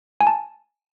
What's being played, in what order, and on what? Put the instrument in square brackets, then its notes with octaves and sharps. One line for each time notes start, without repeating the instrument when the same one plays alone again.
[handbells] G#5
A5